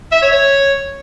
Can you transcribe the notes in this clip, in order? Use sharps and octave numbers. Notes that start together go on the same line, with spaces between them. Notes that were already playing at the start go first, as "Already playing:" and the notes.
E5
C#5
C#5